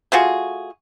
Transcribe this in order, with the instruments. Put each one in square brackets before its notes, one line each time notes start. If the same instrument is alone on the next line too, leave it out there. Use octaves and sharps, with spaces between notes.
[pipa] A3 F4 F#4 G#4